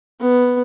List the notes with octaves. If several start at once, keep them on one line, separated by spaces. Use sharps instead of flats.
B3